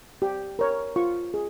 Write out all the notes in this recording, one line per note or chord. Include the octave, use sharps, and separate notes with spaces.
G4
A#4 C#5
F4 C#6
G#4